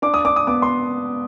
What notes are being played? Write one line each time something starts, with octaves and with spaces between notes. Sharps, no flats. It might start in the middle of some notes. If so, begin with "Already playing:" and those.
D4 D6
D#6
D4 D6
D#6
B3 D6
C6